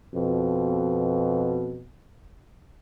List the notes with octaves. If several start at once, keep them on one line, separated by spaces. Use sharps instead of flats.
F2 B2